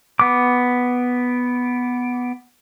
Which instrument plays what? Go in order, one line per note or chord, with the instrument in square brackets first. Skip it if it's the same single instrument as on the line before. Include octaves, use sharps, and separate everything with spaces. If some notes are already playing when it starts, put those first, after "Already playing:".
[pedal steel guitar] B3 D6